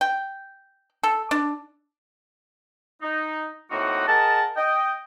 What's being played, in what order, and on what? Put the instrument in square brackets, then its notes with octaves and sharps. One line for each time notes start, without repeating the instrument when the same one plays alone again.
[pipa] G5
A4
D4
[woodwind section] D#4
A2 A#3 C4 D#4 F#4
G#4 A#4 D#5 F#5 A5
D#5 G5